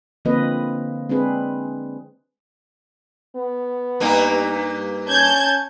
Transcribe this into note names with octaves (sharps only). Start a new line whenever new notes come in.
D3 F3 A#3 C4 B4 D#5
G#3 C4 D4 G#4 B4
B3
G2 A#3 D#4
C#4 A5 G6 G#6